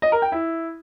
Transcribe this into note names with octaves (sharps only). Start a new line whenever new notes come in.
D#5
A#4
G5
E4